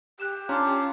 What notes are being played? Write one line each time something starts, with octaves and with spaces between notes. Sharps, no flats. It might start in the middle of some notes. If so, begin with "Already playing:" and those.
G4 F#6 E7
C#4 D4 F4 A5 A#5 D6